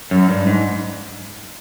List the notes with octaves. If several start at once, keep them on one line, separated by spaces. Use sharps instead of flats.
F#2
G2
G#2